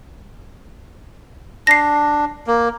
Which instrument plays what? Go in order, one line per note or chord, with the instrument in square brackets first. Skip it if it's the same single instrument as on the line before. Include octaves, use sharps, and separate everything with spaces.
[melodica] D4 [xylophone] A#6 C7
[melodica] A#3